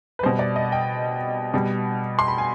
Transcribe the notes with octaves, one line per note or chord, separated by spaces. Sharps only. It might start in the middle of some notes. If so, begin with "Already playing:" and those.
B4
B2 G3 C5
D5
D#5
G5
B2 G3
C6
B5
G#5